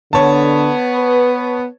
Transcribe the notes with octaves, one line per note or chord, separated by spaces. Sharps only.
D3 B3 C#5 A5
B4